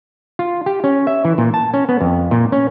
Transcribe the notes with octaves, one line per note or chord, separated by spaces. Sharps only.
F4
G4
C#4
E5
E3
A#2
A5
C#4
B3
F2
A#2
C#4